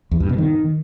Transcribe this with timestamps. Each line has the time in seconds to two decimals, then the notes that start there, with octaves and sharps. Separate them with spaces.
0.11 E2
0.20 G2
0.29 B2
0.38 D#3